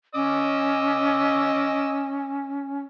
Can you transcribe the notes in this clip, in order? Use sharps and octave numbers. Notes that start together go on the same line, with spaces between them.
C#4 D#5 D6 E6